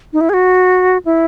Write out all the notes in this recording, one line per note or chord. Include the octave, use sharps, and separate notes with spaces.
D#4
E4
G#4
F#4
E4